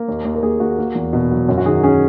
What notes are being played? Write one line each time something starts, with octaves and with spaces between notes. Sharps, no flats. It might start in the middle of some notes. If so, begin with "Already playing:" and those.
Already playing: A#3
D#2
D#2
A#4
D#2 G#4
D#2 F#4
A#3
E2
B2
F#3
F#2
F#4
D#3 G#4
C#4 G#4